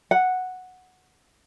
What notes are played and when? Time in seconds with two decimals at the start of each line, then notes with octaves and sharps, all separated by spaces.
0.11 F#5